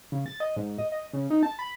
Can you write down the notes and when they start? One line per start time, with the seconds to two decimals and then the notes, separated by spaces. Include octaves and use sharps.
0.12 C#3
0.26 A6
0.40 D#5
0.57 G#2
0.78 D#5
0.92 D#5
1.13 C#3
1.30 D#4
1.43 A5
1.59 B5